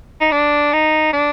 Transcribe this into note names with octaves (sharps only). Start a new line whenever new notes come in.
D#4
D4
D#4
D4